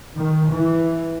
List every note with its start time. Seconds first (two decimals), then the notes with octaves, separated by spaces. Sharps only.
0.16 D#3
0.52 E3